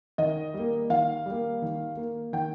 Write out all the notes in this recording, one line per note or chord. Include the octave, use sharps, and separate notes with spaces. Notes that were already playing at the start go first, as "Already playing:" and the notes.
D#3 D#5
G3
A#3
D#3 F5
G3
A#3
D#3
A#3
D#3 G5